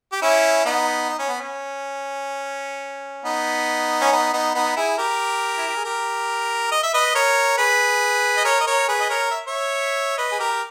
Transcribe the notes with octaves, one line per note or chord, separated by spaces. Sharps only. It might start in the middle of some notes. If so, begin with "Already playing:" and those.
G4
C#4 E4
B3 D#4
D#4
C#4
B3
C#4
B3 D#4
C#4
B3 D#4
B3 D#4
B3 D#4
E4 G#4
G4 A#4
E4
G4
G#4
G4 A#4
D#5
E5
B4 D#5
A#4 C#5
G#4 B4
D#5
A#4 C#5
D#5
A#4 C#5
G#4 B4
D#5
A#4 C#5
E5
C#5 E5
B4 D#5
G#4
G4 A#4